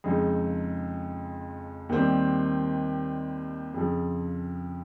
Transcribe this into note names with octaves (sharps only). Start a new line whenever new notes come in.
F2 C#3 F3 G#3 D#4
D#2 D#3 G3 C4
F2 C#3 F3